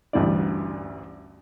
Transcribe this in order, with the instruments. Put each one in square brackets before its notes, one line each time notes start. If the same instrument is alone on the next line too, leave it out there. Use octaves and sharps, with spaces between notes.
[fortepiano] A1 D2 G2 D3 E4 D5